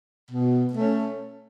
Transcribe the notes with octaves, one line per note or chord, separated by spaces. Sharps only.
B2
A3 C#4